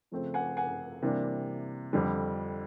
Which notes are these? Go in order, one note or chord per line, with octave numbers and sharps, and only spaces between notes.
C#3 F3 A3 C4
F#5 G#5
F#5 G#5
C3 E3 G3 A#3 D4
F2 D3 G3